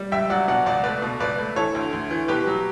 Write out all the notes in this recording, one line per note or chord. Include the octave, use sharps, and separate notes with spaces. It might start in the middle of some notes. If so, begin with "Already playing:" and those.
Already playing: G3
C#2 E5 G5
F#3 D5 F#5
B2 D5 F#5
C#2 D5 F#5
A3 B4 D5
B2
C#2 B4 D5
A3
E3 A4 C#5
D2
D2
E3
B2 G4 B4
F#3